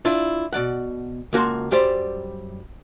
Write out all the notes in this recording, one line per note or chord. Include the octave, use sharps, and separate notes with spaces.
D4 E4 F4
B2 D5 F#5
C#2 A#3 F#4 A5 C6
F#2 G3 G4 C5 D5